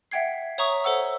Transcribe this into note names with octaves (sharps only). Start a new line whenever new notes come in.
E5 F#5 G5 G#6 C7
C#5 E5 A#5 C#6 D#6
A4 C5 F#5 E6